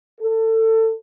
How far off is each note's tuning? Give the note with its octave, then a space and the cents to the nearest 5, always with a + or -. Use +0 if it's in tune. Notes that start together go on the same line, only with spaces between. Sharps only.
A4 +25